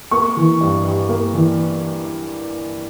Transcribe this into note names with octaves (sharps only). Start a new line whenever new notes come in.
A#3 C#6
E3
G2
G2
A#3
E3